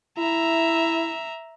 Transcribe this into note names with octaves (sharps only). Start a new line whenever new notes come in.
E4 E5 A#5